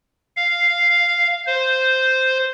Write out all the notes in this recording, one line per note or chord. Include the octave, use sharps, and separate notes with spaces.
F5
C5